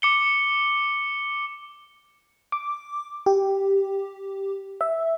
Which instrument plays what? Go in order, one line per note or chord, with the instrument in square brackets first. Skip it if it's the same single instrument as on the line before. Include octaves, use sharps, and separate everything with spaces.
[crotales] D6 C#7 G7
[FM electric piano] D6
G4
E5